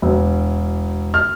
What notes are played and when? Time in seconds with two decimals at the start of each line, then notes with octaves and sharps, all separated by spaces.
0.02 E1
1.14 F6